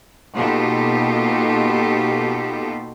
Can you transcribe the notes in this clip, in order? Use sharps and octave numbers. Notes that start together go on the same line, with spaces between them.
B2 A#3 D#4 F4 G4 A4